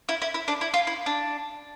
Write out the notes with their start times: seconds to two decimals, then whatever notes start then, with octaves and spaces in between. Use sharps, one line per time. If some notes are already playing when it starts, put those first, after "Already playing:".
0.09 E4
0.22 E4
0.34 E4
0.48 D4
0.61 E4
0.74 F4
0.87 E4
1.06 D4